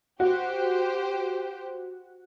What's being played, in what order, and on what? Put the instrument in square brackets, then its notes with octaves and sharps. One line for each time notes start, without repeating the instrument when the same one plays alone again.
[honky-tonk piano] F#4 [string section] G4 C5